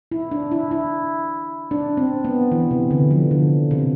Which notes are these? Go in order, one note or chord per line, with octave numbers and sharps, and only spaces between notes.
E4
D4
E4
E4
D4
C4
B3
E3
C3
D3
F3
D3
C3